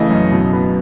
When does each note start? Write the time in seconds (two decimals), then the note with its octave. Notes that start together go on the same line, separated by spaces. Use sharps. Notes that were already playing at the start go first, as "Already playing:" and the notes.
Already playing: C#3 E3 A3 D#5
0.10 F#2
0.31 B2
0.53 B3